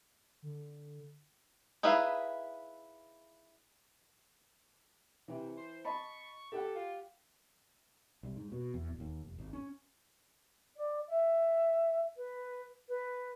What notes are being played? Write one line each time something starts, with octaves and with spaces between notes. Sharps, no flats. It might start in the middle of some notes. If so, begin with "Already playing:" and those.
D3
D#4 E4 G#4 B4 F5
C3 E3
C5
D#5 A5 B5 C#6
G4 A4 F#5
F4
C2
G#2
B2
E2
D1
D#2
F1
G#1
C#4
D5
E5
B4
B4